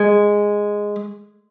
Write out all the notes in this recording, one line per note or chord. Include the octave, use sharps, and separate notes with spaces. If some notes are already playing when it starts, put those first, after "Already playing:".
Already playing: G#3